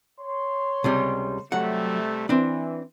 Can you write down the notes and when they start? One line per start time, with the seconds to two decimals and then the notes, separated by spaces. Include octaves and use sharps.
0.20 C#5 C6
0.84 C#2 C3 G3
1.52 C3 F#3 G3 A3 F#5
2.29 E3 C4 D4